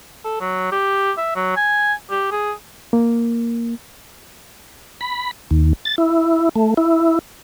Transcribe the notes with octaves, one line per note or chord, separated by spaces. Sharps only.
A4
F#3
G4
E5
F#3
G#5
G4
G#4
A#3
B5
D#2
A6
E4
A3
E4